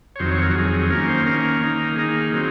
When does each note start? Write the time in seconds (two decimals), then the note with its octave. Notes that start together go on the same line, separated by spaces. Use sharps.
0.16 C#5
0.19 F2 D#3 F#3 C5
0.31 C#5
0.43 A#4
0.49 F#4
0.55 F2 D#3 F#3 G#4
0.90 D#3 A#3 C#4 A#4
1.08 C5
1.25 D#3 A#3 C#4 A#4
1.61 D#3 A#3 D#4
1.96 D#3 A#3 D#4 G#4
2.33 D#3 F#3 C4